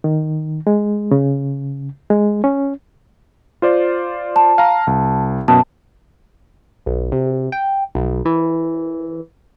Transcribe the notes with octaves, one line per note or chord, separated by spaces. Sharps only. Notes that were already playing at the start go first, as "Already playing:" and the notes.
D#3
G#3
C#3
G#3
C#4
F4 C5 D5
A5
F5 A#5
C2
F#2 B2 A5
B1
C3
G5
B1
E3